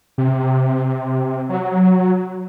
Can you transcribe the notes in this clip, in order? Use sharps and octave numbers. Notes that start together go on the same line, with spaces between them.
C3
F#3